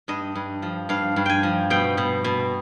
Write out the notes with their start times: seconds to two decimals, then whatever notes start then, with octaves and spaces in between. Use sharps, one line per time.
0.08 G2 D#5
0.35 G2
0.62 F3
0.89 G2 F5
1.16 G2
1.26 G5 G#5
1.43 F3
1.70 B2 G5
1.97 B2
2.24 B2